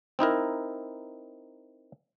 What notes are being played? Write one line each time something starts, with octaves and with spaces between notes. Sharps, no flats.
C4 D#4 E4 A#4